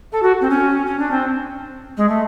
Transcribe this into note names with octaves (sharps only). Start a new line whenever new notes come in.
A4
F#4
C4
C#4
C#4
D4
C4
G#3
A3